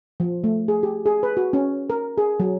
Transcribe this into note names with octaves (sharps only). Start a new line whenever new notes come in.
F3
A3
G#4
G4
G#4
B4
F#4
C#4
A#4
G#4
F#3